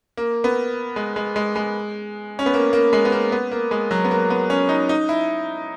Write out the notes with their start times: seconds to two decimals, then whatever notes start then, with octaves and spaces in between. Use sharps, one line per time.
0.17 A#3
0.44 B3
0.96 G#3
1.16 G#3
1.36 G#3
1.56 G#3
2.39 C#4
2.46 B3
2.54 A#3
2.73 A#3
2.93 G#3
3.05 B3
3.12 A#3
3.32 B3
3.51 A#3
3.71 G#3
3.91 F#3
4.04 B3
4.11 A#3
4.30 B3
4.50 C#4
4.69 D#4
4.89 D#4
5.09 E4